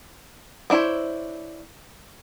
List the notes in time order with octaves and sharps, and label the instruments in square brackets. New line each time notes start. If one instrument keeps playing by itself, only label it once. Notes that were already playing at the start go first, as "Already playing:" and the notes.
[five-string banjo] B3 D4 E4 C5 C#5